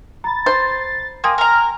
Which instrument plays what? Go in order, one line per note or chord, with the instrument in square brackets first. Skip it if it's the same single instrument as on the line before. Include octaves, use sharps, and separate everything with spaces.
[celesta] A#5 B5 [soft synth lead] A6
[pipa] C5
[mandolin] A#3 [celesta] G5 G#5 C6 [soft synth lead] D#6
[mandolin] A#4 A#5 [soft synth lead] F6